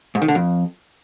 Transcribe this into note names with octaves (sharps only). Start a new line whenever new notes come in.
G#2
D#3
D3
F2